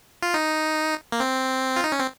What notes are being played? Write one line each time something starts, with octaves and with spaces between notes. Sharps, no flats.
F4
D#4
A#3
C4
F4
D#4
C#4
C4